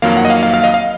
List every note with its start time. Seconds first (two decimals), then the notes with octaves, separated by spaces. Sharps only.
0.02 F2 D#3 F#3 A#3 F5
0.17 F#5
0.25 D#5
0.30 F5
0.43 F5
0.54 F5
0.63 D#5
0.74 F5